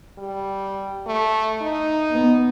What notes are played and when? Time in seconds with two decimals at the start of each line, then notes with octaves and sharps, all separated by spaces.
0.18 G3
1.07 A3
1.62 D#4
2.11 B3